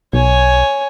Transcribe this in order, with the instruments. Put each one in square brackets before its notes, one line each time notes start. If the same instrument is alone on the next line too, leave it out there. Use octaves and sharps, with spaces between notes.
[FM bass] B1 [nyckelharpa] C#5 G#5